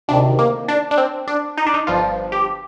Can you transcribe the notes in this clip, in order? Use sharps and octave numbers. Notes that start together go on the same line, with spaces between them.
D2 C3 D#3 D4
A#3
D4
D4
C4
D4
D#4
D4
D#4
G1 G2 F3 F4
G4